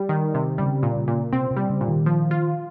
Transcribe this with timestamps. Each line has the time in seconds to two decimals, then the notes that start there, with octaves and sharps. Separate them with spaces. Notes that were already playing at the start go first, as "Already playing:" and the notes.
Already playing: G3
0.09 D#3
0.34 C3
0.58 C#3 G3
0.83 A#2
0.95 C#3
1.08 A#2
1.33 C3 C4
1.50 C3
1.56 G3
1.69 C#3
1.81 A#2
1.88 D#3
2.06 F3
2.31 F4